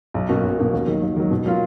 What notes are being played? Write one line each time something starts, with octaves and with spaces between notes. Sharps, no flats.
B1
B2 A#3 C#4 F#4
B1
B2 A#3 C#4 F#4
D#2
D#3 F#3
D#2
D#3 F#3
B2
F#3 A#3 F4